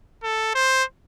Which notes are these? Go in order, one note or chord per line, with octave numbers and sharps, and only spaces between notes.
A4
C5